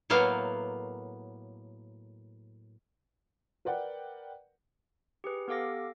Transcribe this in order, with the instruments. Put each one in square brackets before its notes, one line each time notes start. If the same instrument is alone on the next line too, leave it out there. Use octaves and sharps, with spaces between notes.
[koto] A2 F#3 A#3 B3 F5
[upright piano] A#4 B4 D5 F#5 G5
[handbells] G4 G#4 B4
B3 G4 A4 F5 D6 A#6